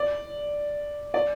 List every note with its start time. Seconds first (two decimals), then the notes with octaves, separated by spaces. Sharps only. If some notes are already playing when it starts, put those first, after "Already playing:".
Already playing: D5
1.14 D5